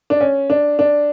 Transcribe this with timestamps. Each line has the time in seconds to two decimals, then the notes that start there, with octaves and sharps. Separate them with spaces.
0.10 D4
0.21 C#4
0.50 D4
0.79 D4